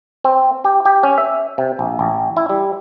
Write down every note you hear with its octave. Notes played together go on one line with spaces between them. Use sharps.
C4
G4
G4
C#4
E5
C3
A#1
A1
E4
G3